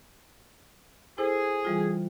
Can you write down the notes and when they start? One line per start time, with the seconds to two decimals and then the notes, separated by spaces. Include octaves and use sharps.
1.18 E4 G#4 A4 C5
1.65 E3 G3 F4